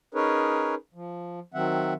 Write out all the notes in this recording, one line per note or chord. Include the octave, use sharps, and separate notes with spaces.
C#4 D#4 G#4 A#4 B4 C#5
F3
D#3 F#3 C4 E5 F#5